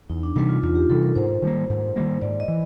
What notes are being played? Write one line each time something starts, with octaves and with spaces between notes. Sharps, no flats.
E2 D#4
D4
C3 E3 G3 D#4
F4
E2 F4
G4
C3 E3 G3 A4
A#4
G#2 C5
D#3 G3 A#3
G#2
D#3 G3 A#3
G#2 D5
D#5
E3